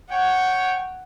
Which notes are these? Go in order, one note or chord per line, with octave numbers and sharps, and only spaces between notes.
C#5 F#5 G5